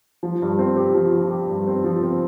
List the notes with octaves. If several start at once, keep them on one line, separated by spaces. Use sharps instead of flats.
F3
G2
C4
G4
F3
F3
G4
G2
C4
F3
C4